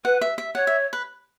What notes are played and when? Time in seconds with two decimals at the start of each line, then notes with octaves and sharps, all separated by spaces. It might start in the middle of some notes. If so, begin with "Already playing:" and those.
0.05 B4 F#5
0.21 E5
0.38 E5
0.55 C#5 F#5
0.67 E5
0.93 B4